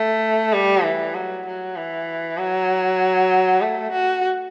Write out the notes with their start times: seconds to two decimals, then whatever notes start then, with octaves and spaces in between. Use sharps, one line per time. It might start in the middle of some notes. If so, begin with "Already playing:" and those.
Already playing: A3
0.53 G3
0.84 E3
1.15 F#3
1.46 F#3
1.76 E3
2.39 F#3
3.62 A3
3.92 F#4